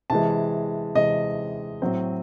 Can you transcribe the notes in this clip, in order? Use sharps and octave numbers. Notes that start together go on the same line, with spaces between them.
C3 E3 G#3 A5
C3 E3 G#3 D#5
A2 F#3 C4